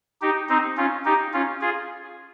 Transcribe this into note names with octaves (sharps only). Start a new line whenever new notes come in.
D#4 G4
C4 D#4
C#4 F4
D#4 G4
C#4 F4
F4 G#4